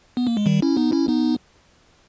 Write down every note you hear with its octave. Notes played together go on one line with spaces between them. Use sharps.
B3
A#3
G#3
D#3 G3
C#4 E4
B3 D#4
C#4 E4
B3 D#4